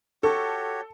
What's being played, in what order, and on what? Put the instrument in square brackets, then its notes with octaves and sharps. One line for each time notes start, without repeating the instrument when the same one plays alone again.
[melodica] F#4 G4 C#5 [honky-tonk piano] A4